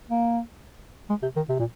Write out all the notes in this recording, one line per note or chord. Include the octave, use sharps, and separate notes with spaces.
A#3
G#3
C3
D#3
C3
A#2